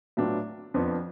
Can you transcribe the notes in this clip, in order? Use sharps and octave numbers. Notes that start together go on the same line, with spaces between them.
A2 F#3 B3 D4 F4
F2 F3 B3 D4